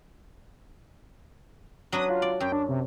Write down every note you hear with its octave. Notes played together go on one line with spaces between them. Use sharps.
F#3 D4 B4 D#6
F4
D5
F#2 G5
D4
C3